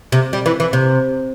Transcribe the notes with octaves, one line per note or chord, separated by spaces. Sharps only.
C3
G3
E3
E3
C3